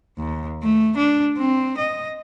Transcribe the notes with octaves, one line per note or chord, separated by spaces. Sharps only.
D#2
A3
D4
C4
D#5